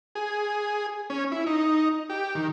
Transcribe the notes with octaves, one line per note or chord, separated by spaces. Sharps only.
G#4
C#4
E4
D#4
G4
D#3